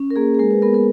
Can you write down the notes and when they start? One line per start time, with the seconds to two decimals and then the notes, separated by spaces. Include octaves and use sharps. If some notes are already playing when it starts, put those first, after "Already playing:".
Already playing: C#4
0.10 A#4
0.16 A#3 G#4
0.35 G#4
0.39 G#3 A#4
0.51 B4
0.62 B3 A#4
0.74 A#4